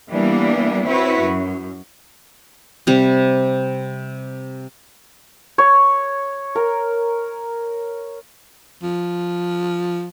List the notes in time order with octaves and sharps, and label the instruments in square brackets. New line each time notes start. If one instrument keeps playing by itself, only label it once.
[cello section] E3 G3 A#3 B3 D4
C4 E4 F#4 B4 C#5
F#2
[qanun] C3 G3
[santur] C#5
A#4
[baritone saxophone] F3